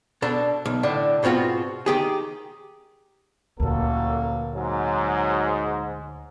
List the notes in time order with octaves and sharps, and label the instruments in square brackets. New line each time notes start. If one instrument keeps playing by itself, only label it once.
[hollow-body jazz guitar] B2 D4 A4
B1
A2 D3 D4
G#2 B2 C4 F4 F#4
D#3 G4 G#4
[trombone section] A1 F#3 A4 [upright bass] D2 A#2 [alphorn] A#3
[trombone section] G#2 [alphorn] F#3